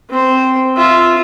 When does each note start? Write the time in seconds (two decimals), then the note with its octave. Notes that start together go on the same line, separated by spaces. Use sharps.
0.10 C4 C5
0.77 F4 E5